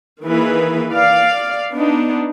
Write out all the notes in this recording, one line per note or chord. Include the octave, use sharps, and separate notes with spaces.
D#3 E3 A#3 G#4 B4
D5 F5
B3 D4 D#4